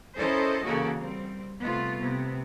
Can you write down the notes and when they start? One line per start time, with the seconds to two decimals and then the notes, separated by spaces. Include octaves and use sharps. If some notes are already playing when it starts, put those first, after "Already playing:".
0.17 C#4 E4 A4 A#4 C5 D#5
0.64 C#3 E3 A#3 F#4 A4
0.99 G3 C4
1.61 C3 G3 A3 B3 F4
1.98 C3 B3